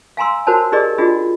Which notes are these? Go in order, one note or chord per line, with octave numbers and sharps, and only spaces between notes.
F5 G#5 A#5 C6 E6
F#4 A#4 C5 C#5 A5
D#4 G4 G#4 A#4 D5 D#5
D4 F4 F#4 G#4 D#5